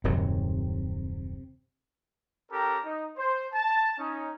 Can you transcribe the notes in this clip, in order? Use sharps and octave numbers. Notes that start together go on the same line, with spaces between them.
D#1 F#2 C3 F#3
C#4 G4 A4 A#4 G5 A#5
D#4
C5
A5
C#4 D#4